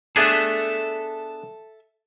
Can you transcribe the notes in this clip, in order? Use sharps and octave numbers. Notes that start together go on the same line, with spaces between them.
B3 D4 G#4 A4 E5